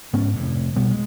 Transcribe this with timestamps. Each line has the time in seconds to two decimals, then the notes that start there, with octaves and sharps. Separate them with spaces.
0.13 G#2 B3 C#4
0.36 F1 A2
0.76 B1 B2 G3 B3
0.91 G#3